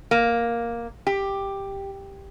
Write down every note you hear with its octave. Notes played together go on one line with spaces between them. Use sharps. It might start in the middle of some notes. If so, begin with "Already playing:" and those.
A#3
G4